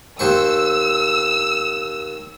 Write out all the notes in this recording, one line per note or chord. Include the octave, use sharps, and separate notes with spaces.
D#2 C5 C#6 E6